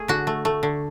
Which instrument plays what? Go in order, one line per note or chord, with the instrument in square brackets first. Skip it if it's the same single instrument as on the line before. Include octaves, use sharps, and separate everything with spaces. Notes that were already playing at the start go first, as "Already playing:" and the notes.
Already playing: [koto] A3 G#4
D3 F#4
A3
A3
D3